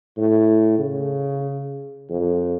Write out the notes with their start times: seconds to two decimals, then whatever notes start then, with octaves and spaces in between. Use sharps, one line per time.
0.18 A2
0.79 C#3
2.10 F2